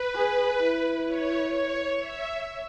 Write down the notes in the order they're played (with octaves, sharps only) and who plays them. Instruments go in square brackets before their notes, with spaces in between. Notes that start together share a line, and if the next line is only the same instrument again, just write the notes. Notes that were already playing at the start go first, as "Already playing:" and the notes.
Already playing: [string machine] B4
[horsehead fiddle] G#4
E4
[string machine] C#5
C#5
E5